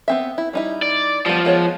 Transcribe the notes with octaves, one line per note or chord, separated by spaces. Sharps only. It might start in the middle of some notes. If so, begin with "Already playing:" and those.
B3 C4 E5
E4
G3 D#4 E4
D5
F3 G3 B3
G#3 B3 C#5